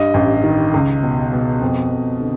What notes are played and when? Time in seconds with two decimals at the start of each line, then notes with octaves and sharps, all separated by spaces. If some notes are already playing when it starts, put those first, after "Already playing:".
Already playing: G2 D#5
0.14 A1
0.44 D#3
0.74 C#2
1.03 B2
1.32 B2
1.61 F2
1.91 F2
2.20 D3